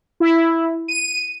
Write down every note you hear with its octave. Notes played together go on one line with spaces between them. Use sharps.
E4
D#7